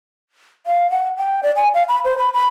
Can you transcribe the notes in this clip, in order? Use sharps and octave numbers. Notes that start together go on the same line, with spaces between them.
F5
F#5
G5
D5
G#5
F5
B5
C5
B5
B5